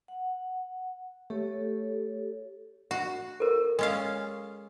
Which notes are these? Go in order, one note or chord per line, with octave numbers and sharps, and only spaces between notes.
F#5
A3 G4 A4 C#5
F#4
A4 A#4
G#3 C#4 F5